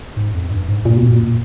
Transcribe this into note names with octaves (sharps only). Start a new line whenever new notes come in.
G#2
F2
G2
G#2
G2 A#2
F#2 B2
A#2